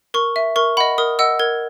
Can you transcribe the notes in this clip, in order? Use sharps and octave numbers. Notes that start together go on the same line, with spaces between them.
A#4 C#6
E5
A#4 C#6
D#5 F#5 B5
A#4 D#6
D#5 F#5 E6
A#4 G#6